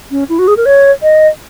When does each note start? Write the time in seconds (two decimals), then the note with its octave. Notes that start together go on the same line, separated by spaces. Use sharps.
0.11 C#4
0.29 E4
0.39 F#4
0.48 G#4
0.57 A#4
0.66 C#5
1.03 D#5